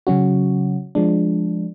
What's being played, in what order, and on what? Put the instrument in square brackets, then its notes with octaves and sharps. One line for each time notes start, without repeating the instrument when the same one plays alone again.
[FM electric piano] C#3 F#3 C#4 F#4
F3 G#3 D4